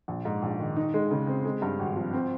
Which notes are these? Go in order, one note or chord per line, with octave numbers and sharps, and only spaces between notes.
A#1
G#2
A#1
D#3
D#4
G#3
C#3
C4
G#3
G2
G#1
F3
C4